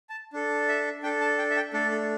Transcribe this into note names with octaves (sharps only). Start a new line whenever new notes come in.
A5
D4 A4
E5
D4 A4 G5
A5
G5
E5
G5
A3 D4 A4
A4